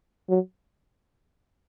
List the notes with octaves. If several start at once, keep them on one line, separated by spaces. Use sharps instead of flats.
F#3